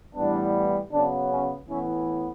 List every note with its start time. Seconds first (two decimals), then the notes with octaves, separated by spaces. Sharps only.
0.15 A2 E3 G3 B3 D4
0.91 C#3 F#3 B3 D4
1.30 C#4
1.68 A2 E3 B3 C#4 E4